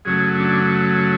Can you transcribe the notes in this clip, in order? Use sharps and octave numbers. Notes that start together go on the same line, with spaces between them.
F#2 C#3 F#3 A3 G#4
D4